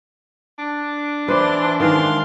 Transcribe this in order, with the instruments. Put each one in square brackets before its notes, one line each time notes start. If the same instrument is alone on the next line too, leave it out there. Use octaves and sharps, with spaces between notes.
[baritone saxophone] D4
[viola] E3 C6 [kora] B4 C5 D5
[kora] D#3 E3 G#3 [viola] F5 C6